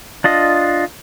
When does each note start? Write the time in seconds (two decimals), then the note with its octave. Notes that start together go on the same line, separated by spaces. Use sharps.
0.24 D4 F4 D#5